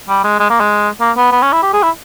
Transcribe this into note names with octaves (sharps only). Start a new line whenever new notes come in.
G3
G#3
G#3
A#3
G#3
A#3
B3
B3
C#4
E4
G4
G#4
E4